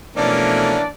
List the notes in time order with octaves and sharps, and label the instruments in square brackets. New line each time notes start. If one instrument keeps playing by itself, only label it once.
[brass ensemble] B2 F3 A3 [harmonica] E3 A#3 C#4 [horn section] D4 D5